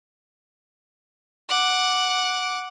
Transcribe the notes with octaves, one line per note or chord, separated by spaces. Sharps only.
F#5 D6